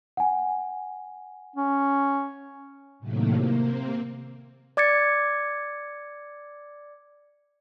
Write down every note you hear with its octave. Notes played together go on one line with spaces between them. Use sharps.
F#5 G#5
C#4
A2 C3 D#3 F#3 A3 A#3
C3 A#3 C4
D5 D6 G#6 A6 C#7